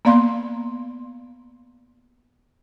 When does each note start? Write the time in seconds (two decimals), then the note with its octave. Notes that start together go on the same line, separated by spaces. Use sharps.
0.05 A#3 B3 D5 F5 C6